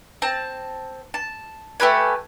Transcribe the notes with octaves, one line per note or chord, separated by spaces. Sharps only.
C4 A5
A5
A3 G4 B4 G#5